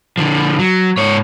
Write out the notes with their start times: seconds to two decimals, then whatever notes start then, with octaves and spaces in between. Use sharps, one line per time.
0.18 D3 F3
0.59 F#3
0.97 G#2 C#5